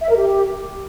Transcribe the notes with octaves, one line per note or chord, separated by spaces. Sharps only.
E5
A#4
G4